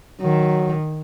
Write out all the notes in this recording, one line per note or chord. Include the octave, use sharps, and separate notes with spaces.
D#3 F#3